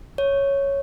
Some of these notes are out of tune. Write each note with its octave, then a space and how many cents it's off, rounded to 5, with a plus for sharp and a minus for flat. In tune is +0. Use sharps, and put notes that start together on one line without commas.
C#5 +0